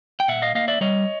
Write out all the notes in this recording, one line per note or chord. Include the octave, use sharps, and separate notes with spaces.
G5
A#2 E5 F#5
D#5 F5
A#3 D#5 F5
D5 E5
G3 C#5 D#5